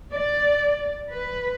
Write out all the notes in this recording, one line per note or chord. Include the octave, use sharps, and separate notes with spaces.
D5
B4